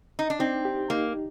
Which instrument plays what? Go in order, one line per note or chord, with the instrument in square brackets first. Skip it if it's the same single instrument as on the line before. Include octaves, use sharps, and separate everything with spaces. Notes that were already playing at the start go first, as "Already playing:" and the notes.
[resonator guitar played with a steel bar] D#4
D4
[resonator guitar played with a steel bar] C4 [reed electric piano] D#4
[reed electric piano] G4
[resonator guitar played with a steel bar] A#3 [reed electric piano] D#4